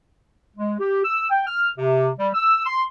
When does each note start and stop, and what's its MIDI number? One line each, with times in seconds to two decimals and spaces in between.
0.56 0.74 56
0.79 1.03 67
1.04 1.28 88
1.30 1.47 79
1.47 1.69 89
1.78 2.08 48
2.18 2.29 55
2.34 2.65 88
2.66 2.83 84